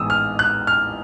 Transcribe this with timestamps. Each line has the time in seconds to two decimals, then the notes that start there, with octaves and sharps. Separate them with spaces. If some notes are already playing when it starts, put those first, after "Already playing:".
Already playing: A1 G#2 E3 G#3 B3 D#6 E6
0.10 F6
0.39 F#6
0.67 F6